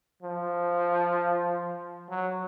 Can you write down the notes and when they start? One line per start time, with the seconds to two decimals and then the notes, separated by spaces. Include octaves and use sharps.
0.22 F3
2.10 F#3